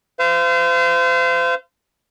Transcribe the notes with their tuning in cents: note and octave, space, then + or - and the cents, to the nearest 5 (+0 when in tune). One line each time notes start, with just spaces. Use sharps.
C5 -35 F5 -35